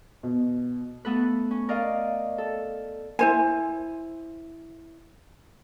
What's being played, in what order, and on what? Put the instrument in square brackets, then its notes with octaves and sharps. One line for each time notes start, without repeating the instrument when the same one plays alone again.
[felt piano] B2
[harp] A3 B3 A4 B4
C#4
A#4 D5 D#5 F5
A4
[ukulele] E4 C5 G#5